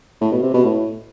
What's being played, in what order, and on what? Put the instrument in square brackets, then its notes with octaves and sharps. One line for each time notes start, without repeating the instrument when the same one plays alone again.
[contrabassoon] A2
B2
C3
B2
A2